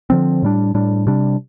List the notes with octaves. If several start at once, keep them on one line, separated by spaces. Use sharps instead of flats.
D3 F3 C4
A2 G3 D4
A2 G3 D4
C3 G3 D4